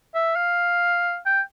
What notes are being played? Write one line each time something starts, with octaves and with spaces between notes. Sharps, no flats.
E5
F5
G5